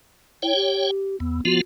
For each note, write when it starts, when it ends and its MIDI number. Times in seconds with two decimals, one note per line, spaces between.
0.42 0.55 64
0.42 0.91 73
0.42 0.91 79
0.55 1.16 67
1.20 1.41 40
1.20 1.41 59
1.45 1.61 53
1.45 1.61 59
1.45 1.61 65
1.45 1.60 66